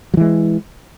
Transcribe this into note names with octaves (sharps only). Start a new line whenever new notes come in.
E3 F#3 G#3